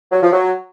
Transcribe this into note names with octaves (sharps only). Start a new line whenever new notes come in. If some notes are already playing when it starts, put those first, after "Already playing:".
F#3
F3
F#3